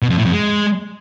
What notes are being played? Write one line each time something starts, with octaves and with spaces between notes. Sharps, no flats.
B2
F2
A2
F2
G#3